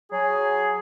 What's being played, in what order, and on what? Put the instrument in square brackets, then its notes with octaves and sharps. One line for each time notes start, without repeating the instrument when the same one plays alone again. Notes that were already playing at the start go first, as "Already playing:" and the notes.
[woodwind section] F#3 G#4